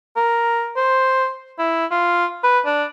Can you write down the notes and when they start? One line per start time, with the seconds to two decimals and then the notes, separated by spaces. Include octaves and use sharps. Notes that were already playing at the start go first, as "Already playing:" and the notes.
0.16 A#4
0.76 C5
1.59 E4
1.91 F4
2.43 B4
2.66 D4